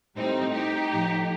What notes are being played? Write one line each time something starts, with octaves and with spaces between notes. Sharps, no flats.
A2 G3 C4 D#4
D#4 G4
A2 F3